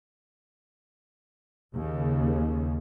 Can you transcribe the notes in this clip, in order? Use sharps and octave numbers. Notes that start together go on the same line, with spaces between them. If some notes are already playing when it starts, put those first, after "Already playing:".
D#2 C#3